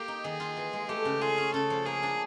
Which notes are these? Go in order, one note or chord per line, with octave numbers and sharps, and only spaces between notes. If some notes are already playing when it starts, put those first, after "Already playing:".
Already playing: A#3 G4
D#4
D#3 G#4
F4
E3
G#3
A3 G4
C#3
F4 G#4
C#4
C#3 A4
F3
A#3 G#4
D4